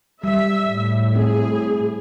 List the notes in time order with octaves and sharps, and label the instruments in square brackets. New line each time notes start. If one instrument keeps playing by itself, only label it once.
[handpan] G3 [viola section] E5
[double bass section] A2
[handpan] C4 E4 [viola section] G#4